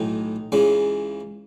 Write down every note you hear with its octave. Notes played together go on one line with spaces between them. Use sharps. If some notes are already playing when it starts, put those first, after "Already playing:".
Already playing: B1 A2 E3 D#4
C#2 C#3 E3